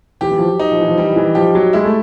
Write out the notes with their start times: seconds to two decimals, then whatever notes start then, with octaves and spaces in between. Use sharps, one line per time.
0.21 E3 G4
0.31 E3
0.39 F3
0.46 F#3
0.59 D#4
0.72 F3
0.80 E3
0.88 F3
0.98 E3 G3
1.12 F3
1.16 E3
1.35 F3 G4
1.55 F#3
1.73 G#3 E4
1.85 A3